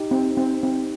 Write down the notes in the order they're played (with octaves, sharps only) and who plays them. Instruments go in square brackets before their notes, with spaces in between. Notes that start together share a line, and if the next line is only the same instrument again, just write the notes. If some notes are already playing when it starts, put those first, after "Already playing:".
Already playing: [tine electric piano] D#4 G4
[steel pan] C4
C4
C4